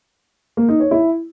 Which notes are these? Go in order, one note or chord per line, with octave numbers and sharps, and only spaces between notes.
A#3
D#4
C#5
E4